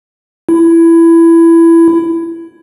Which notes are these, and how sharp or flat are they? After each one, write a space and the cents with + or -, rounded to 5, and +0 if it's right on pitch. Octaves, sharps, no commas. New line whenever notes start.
E4 +15